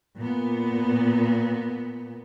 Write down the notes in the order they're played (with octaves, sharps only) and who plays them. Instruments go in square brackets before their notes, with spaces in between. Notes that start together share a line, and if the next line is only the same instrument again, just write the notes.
[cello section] A#2 B3